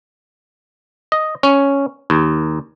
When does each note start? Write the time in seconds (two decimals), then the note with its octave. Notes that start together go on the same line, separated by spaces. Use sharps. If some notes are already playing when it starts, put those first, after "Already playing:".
1.12 D#5
1.43 C#4
2.10 D#2